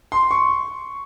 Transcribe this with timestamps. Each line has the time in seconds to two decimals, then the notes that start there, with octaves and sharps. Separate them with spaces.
0.12 C6
0.31 C#6